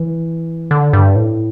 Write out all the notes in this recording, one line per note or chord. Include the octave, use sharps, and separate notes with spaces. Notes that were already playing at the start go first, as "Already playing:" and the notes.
Already playing: E3
D3
G2
A2